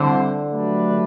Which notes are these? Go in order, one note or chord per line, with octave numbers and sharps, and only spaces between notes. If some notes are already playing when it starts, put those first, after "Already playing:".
Already playing: D3 G3 C4 E4 A4 C5
F#3 A3 D4 G4 B4